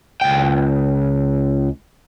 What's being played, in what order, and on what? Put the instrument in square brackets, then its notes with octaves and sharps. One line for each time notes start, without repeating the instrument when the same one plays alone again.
[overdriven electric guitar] C#2 G5